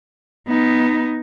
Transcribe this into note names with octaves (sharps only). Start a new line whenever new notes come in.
B3 D#4